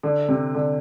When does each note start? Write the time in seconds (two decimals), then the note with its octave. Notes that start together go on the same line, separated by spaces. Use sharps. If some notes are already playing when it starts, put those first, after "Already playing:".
0.03 D3
0.28 C3
0.55 D3